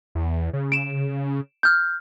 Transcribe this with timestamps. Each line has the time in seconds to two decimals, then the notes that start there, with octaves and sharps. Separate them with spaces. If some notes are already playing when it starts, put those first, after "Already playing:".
0.15 E2
0.53 C#3
0.72 D7 E7
1.63 F6 G6